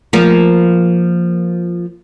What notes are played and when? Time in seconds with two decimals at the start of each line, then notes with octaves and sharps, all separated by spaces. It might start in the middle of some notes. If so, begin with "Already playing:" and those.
0.13 F3 A#3